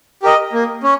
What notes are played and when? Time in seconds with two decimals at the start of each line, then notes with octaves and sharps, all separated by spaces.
0.23 G4 A#4 D#5
0.53 A#3
0.83 C#4